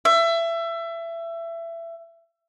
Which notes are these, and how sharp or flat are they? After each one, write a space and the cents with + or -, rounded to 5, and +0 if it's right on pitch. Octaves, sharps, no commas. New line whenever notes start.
E5 +25